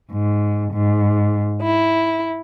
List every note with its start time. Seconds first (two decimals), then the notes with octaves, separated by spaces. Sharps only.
0.11 G#2
0.72 G#2
1.63 E4